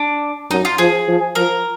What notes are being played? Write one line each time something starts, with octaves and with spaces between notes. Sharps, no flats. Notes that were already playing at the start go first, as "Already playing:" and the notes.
Already playing: D4
F#2 D#4
F4
F3 G#4
F3
F3 A#4